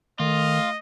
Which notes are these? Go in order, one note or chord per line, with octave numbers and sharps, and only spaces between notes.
D#3 A3 F4 D#5